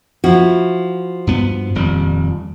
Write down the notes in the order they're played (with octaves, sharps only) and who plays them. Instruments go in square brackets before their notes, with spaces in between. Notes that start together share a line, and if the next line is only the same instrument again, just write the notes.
[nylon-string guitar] F3 E4 F#4
[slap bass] G2 B3
D#1 F2 G3